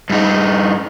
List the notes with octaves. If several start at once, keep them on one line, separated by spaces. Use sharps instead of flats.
G2 D#4